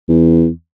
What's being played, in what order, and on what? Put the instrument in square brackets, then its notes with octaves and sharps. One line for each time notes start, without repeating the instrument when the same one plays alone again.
[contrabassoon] E2